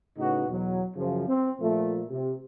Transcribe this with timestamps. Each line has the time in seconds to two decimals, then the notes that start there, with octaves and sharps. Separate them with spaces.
0.17 A2 C#3 B3 D#4 F#4
0.48 E2 B2 F#3
0.95 F#2 C#3 F3
1.27 C4
1.60 A#2 F3 A3
2.11 C3